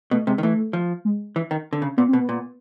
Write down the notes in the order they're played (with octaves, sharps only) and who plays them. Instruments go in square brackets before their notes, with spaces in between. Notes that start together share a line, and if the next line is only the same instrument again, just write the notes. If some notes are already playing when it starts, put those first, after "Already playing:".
[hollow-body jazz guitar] B2 [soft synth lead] A3
[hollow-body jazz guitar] C3 [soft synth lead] G#3
[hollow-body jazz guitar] D#3
[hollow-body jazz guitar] E3 [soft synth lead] A3
[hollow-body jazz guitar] F3
[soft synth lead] G#3
[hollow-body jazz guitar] E3
D#3
D3
C#3
[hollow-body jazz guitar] A#2 [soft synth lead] B3
[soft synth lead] C4
[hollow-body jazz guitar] B2
[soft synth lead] B3
[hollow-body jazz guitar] A#2